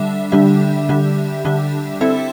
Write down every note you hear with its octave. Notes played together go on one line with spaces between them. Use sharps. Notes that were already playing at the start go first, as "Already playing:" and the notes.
Already playing: D3 G3 D4 E5
D3 G3 D4 G4 E5
D3 G3 D4 G4 E5
D3 G3 D4 G4 E5
C4 E4 A4 E5